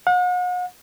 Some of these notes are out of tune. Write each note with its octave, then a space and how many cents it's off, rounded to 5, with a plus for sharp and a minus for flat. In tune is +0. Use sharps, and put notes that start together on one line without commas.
F#5 -40